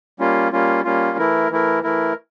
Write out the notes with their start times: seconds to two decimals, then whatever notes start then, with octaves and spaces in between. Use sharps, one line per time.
0.19 G3 A#3 C#4 F4
0.52 G3 A#3 C#4 F4
0.85 G3 A#3 C#4 F4
1.18 E3 A3 E4 A#4
1.50 E3 A3 E4 A#4
1.83 E3 A3 E4 A#4